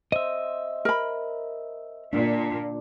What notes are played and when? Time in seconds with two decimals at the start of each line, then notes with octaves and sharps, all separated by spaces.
0.12 C5 D#5 E5
0.85 A#4 B5
2.13 A#2 D4